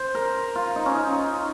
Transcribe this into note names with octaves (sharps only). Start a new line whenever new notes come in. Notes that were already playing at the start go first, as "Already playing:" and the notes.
Already playing: C5
A#4
F4
D#4
C#4
D#4